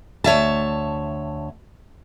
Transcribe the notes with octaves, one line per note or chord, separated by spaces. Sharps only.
D2 C#5 E5 A5